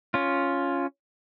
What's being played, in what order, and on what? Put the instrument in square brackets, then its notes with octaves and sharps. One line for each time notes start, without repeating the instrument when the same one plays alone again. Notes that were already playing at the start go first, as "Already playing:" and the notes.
[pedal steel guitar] C#4 F4